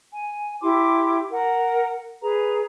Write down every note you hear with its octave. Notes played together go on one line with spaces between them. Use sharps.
G#5
E4 G4 C6 D6
A#4 F#5
G#4 B4 A#5